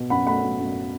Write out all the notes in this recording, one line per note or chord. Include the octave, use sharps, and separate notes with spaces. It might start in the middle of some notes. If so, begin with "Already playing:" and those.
Already playing: B2
F#2 F#5 B5
A3 F#5 B5
F#2
F#2